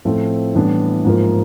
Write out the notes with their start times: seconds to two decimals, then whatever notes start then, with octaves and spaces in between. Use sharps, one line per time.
0.05 A2 F3 A3 C4 F4
0.55 A2 E3 G3 B3 D4
1.05 G#2 F3 A#3